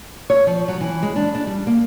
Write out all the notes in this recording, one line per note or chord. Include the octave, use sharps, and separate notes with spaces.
C#5
F3
F#3
E3
G#3
D4
D4
G3
A#3